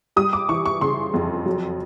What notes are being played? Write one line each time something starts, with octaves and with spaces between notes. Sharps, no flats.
G3 D#6
D6
E3 C#6
C#6
C#3 C6
F2
F#3